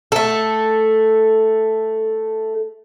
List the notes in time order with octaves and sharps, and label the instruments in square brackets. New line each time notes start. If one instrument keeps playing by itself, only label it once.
[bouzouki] A3 A4